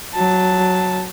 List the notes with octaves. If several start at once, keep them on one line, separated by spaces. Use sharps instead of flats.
F#3 A5